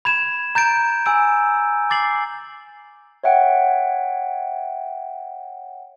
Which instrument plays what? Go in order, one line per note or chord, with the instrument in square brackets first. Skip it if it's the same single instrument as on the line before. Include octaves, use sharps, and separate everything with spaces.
[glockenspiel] B5 G#6 E7
A#5 G6 A6 D7
G#5 E6 D7
D6 A6 C7 F#7
[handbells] C#5 E5 F#5 G5